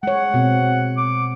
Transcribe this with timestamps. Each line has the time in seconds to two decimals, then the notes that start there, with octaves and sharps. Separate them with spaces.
0.03 G#3 C#5 F#5
0.34 B2 C4
0.97 D6